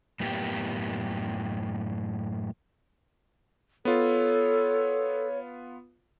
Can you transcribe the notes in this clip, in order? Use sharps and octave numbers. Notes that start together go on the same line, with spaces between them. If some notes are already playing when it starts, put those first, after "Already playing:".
F#2 A2 A#3 B3 G4
B3 F4 A4 C#5